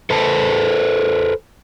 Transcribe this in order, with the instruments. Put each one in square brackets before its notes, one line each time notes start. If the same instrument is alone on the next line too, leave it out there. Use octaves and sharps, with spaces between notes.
[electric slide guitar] A4 B4 C5 A5